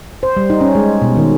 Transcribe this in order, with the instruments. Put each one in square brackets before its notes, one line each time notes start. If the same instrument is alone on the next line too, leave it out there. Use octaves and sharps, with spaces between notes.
[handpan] C5
G3
D#4
C#4
G#3
B2
D#3